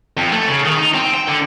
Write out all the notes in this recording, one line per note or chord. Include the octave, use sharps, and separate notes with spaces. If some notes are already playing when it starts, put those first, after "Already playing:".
F2
A3
C#3
D#3
D#4
C4
G5
D3